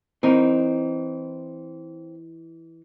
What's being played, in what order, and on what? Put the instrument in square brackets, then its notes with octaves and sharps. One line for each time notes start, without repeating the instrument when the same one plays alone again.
[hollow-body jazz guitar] E3 D#4 A#4 [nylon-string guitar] C4